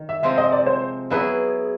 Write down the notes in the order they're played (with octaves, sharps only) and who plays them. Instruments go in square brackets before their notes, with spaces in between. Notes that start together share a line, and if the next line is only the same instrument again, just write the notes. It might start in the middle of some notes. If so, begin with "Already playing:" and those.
Already playing: [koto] D#3
[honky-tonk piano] E5
[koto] C3 F3 G#3 C4 [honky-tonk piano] E5
[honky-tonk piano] D#5
D5
C5
[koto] F#3 B3 E4 G#4 [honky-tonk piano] B4